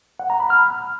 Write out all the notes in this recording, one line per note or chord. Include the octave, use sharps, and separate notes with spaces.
F#5
A#5
B5
F6